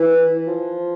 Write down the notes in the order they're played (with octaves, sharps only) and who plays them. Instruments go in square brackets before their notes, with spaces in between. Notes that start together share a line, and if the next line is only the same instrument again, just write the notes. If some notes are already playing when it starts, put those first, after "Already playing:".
Already playing: [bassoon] E3
F3